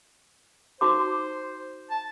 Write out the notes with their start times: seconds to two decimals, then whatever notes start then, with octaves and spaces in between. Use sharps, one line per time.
0.81 D#4 F#4 C5 D6
1.90 A5